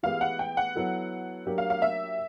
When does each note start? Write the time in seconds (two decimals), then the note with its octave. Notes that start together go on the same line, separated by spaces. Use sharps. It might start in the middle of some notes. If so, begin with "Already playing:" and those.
0.03 E3 G#3 B3 E4 G4 F5
0.21 F#5
0.39 G5
0.57 F#5
0.75 F#3 B3 E4 A4
1.46 F#3 A#3 D4 G4 A#4
1.58 F5
1.70 F5
1.82 E5